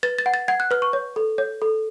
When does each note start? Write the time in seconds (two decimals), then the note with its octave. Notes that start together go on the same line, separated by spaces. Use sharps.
0.03 B4 A6
0.19 A6
0.26 F#5
0.34 A6
0.48 F#5 G#6
0.60 F#6
0.71 B4 F6
0.82 C#6
0.93 C#5
1.16 A4
1.38 C#5
1.62 A4